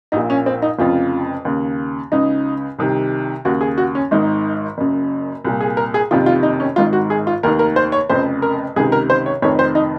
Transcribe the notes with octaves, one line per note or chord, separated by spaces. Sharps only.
A#1 A#2 D#4
C#4
C4
D#4
F1 F2 C#3 F4
D#2 C#3
C#2 C#3 D#4
C2 C3 D#3
D#2 C#3 F#4
G#4
F#4
C#4
G#1 G#2 D#3 D#4
F#1 F#2 C#3
C2 A#2
G#4
A#4
G#4
F#1 F2 C3 D#3 F4
F4
D#4
C#4
G#1 G#2 D#3 F4
F#4
G#4
F4
F1 D#2 D#3 A#4
A#4
C5
C#5
F1 F2 C#3 C5
A#4
C#2 C3 D#3 G#4
A#4
C5
C#5
F1 F2 D#3 C#5
C5
D#4